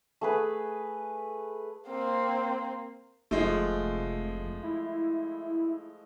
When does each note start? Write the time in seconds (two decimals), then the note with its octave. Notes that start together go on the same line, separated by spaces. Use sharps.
0.21 A3 G#4 B4
1.88 A#3 C4
3.31 F1 F3 G#3 A3
4.63 E4